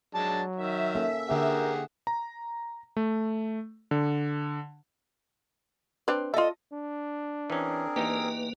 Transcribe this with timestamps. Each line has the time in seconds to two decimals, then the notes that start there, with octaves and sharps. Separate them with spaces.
0.15 F#3 G#3 D4 A5
0.56 D#3 E5
0.95 A#3 C#4 A4
1.30 D3 A#3 G4 G#4 A#4 F#5
2.07 A#5
2.97 A3
3.91 D3
6.08 C4 D4 B4
6.34 F4 A4 D#5 E5
6.73 D4
7.50 E3 C4 C#4 G#4 A#4
7.96 E2 A#3 D#4 G4 B4